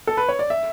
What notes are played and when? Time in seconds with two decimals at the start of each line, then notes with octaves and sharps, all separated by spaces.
0.07 A4
0.17 B4
0.29 C#5
0.39 D5
0.50 E5